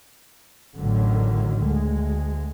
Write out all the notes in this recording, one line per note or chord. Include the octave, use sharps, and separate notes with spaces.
A1 A2 D3 D#3 F#3
D2 G#3